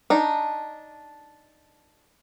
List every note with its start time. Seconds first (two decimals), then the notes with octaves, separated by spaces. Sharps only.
0.10 D4 D#4